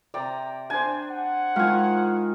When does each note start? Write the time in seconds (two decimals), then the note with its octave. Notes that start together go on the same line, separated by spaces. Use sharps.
0.14 C3 D5 G5 A#5
0.70 D4 C5 G#5
1.11 F#5
1.56 D#3 G#3 E4 F4 F5 G#5